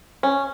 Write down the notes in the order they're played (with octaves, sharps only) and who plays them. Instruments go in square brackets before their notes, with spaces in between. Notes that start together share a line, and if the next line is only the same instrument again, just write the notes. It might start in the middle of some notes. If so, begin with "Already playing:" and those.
[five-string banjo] C#4